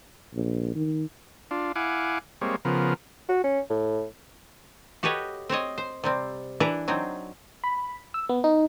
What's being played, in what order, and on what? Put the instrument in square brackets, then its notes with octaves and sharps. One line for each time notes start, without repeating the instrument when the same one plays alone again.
[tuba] A#1
D#3
[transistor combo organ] D4 F4
E4 F5 F#5 G#5 D6
G3 G#3 A#3 C4 C#5
C#3 F3 B3 A#4
[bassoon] F#4
C#4
A2
[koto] F#4 G4 A4 B4 C#5 D#5
C4 C5 C#5 D#5
C5
C3 G3 C4
E3 D4 E4 B4 A#5
F#3 C4 D4 D#4
[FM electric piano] B5
E6
B3
D#4